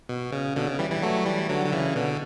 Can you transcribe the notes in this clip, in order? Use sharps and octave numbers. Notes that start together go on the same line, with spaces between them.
B2
C#3
B2 D3
C#3
E3 G3
E3 G3
F#3 A3
E3 G3
D3 F#3
D3
C#3 E3
B2 D3